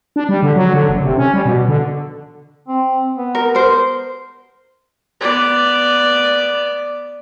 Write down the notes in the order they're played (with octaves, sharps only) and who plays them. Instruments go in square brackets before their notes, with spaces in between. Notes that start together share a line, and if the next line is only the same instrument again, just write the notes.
[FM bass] D4
G3
D3
F#3
D3
F#1
C3
C#4
G3
B2
D3
[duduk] C4
B3
[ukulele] A#4
A#4 C5
[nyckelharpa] B3 D5